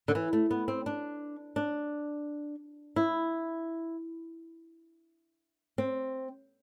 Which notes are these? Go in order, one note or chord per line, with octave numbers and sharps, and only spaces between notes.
D3
E3
A3
B3
C4
D4
D4
E4
C4